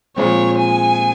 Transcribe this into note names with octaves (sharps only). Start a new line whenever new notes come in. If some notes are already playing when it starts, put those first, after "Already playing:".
A#2 F3 G#3 C4 C#5
G#5